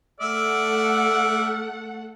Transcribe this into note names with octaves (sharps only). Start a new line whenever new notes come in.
A3 A4 D5 E5 F#5 E6 F6